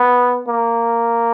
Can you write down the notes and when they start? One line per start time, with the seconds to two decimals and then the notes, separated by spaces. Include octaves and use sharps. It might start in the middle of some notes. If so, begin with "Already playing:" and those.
Already playing: B3
0.47 A#3